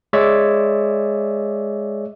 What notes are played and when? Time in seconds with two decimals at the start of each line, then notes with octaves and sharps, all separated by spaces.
0.13 G#3 C#5 D5 E5